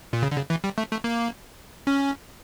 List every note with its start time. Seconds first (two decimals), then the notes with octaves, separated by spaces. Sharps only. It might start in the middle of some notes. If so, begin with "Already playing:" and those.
0.13 A#2
0.22 C#3
0.32 D3
0.36 C#3
0.50 E3
0.64 G3
0.78 A3
0.91 A3
1.04 A#3
1.87 C#4